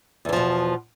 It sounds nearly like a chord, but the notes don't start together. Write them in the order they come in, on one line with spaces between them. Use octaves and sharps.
E2 E3 F3 B2